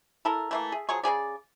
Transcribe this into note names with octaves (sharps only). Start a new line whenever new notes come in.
E4 A4 A#4
E3 A3 A#3
G#4
F3 F#3 G#4 C#6
C#3 C#4 G#4 D5